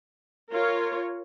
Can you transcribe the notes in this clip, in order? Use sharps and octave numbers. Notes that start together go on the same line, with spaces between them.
F4 A#4 C#5